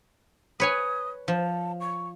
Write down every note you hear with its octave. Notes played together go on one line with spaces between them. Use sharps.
B4 C#5 G#5 D#6
F3 A5
C#6